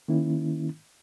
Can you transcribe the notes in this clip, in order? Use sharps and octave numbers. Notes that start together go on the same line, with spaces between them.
D#3 A#3 C#4 E4